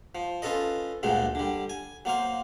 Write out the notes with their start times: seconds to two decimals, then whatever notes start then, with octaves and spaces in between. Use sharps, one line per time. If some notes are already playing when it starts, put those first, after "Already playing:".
0.15 F3
0.42 C#4 F4 A4 B4 D#5
1.03 D2 G2 A#2 F#3 G#3
1.35 D3 G3
1.69 G#5
2.05 F#3 A#3 C5 F5